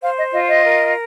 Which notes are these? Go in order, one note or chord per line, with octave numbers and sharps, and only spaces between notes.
C5 F5
D#5
F4 D#5
D#5
A#4